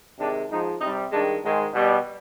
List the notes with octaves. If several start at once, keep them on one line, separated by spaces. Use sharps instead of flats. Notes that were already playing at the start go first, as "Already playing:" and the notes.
C3 D#3 G#3 D4
G#2 F3 G#3 D#4
C3 G3 D#4
G2 D#3 G#3 D4
G#2 D#3 G#3
B2 G3